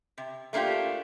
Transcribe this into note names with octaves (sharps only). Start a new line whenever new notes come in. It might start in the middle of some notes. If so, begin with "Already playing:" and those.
C3
A3 A#3 D4 F4 G4